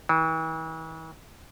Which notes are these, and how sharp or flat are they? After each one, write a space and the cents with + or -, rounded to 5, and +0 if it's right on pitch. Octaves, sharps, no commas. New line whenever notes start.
E3 -40